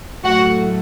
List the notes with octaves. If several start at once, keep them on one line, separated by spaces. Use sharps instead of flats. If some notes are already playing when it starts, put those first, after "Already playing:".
A2 F#3 A3 F#4 F#5